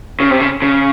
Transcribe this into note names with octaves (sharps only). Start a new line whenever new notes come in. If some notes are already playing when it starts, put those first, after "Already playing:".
C#3
C3
C#3
C#3